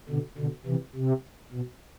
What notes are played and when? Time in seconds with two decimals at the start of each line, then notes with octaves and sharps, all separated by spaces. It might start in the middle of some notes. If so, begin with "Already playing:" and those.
0.09 B2 D3
0.38 B2 D3
0.66 C3 E3
0.95 C3
1.52 B2